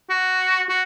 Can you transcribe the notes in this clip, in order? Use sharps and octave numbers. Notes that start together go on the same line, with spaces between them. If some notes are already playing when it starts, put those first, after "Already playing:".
F#4
F#4